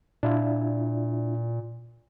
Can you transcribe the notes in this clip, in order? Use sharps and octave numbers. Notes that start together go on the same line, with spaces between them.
A#2 D4 E4 F4